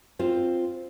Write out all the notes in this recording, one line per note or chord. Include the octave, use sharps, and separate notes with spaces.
C4 F4 C5